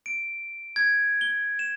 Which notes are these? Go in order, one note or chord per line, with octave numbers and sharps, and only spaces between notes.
D7
G#6
G7
E7